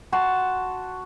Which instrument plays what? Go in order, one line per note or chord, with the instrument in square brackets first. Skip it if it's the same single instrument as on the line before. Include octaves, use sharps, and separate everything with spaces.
[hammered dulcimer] F#4 A5 C6